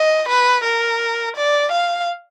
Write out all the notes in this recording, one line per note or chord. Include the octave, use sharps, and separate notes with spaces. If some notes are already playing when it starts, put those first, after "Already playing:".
Already playing: D#5
B4
A#4
D5
F5